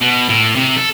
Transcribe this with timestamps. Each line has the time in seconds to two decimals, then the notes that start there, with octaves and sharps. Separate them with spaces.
0.01 B2
0.29 A2
0.55 C3
0.76 A4